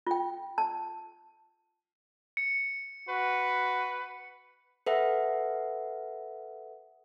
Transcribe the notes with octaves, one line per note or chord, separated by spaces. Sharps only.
F4 G5
A5
C#7
F#4 B4
A4 B4 E5 F#5